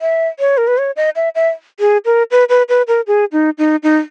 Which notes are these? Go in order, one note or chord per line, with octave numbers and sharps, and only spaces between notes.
E5
C#5
A#4
B4
C#5
D#5
E5
E5
G#4
A#4
B4
B4
B4
A#4
G#4
D#4
D#4
D#4